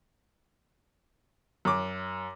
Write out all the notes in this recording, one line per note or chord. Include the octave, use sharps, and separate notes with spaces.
F#2 D6